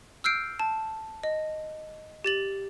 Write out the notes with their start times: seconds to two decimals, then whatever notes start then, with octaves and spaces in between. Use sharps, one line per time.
0.24 E6 F6 G6 C7 D7
0.59 A5
1.24 D#5
2.24 G4 A6 F#7